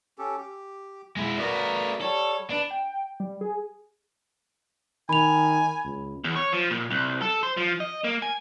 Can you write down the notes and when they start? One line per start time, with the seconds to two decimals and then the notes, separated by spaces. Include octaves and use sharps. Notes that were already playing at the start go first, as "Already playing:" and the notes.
0.18 C#4 G4 A4
0.37 G4
1.17 G#3 E4
1.38 A3 B3 F#4 A#4 D5
2.01 G3 A4 C#5
2.50 D4 B4
2.70 G5
3.20 G3
3.41 G#4
5.09 D#3 G#5 B5 F7
5.84 C#2
6.24 E2
6.36 C#5
6.52 F3
6.71 A#2
6.90 C2
7.21 A4
7.43 C5
7.57 F3
7.80 D#5
8.04 A#3
8.22 G#5